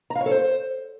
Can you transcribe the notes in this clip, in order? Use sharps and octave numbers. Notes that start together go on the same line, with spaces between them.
A#5
F5
C#5
A4
C5